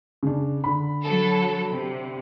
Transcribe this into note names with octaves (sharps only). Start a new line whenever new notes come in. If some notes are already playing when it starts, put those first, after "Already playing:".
C#3 D4
D3 B5
F#3 A4
C3